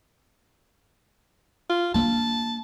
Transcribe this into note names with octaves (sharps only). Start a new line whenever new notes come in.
F4
A#3 D4 A5